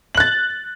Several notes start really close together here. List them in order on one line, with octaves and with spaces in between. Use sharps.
F#7 F#6 A6